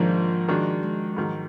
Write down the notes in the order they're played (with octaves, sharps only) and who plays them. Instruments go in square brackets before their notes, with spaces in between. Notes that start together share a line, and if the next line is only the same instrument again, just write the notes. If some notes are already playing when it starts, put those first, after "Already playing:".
Already playing: [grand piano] G#2 D#3 A#3 D4 [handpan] F3
[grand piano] D#3 G#3 D4 F#4
[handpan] G#3
[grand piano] G#2 D#3 F#3